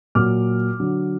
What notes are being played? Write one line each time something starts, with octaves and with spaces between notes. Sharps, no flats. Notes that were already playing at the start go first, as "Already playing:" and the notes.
A#2 F#3 D6 F6
D3 F#3